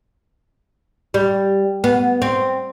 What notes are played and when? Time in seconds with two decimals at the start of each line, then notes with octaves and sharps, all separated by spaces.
1.14 G3
1.84 B3
2.22 C4